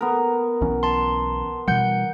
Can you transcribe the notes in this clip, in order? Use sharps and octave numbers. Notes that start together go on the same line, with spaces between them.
B3 A#4
B1 E3 C#4
A5 C6
B2 E3 G3 F#5 G6